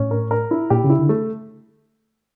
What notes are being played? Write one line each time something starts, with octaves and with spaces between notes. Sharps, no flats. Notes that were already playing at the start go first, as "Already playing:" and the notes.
Already playing: A2 C#4
A#4
A#4
E4
A#2 G4
C#3
E4
D3
A3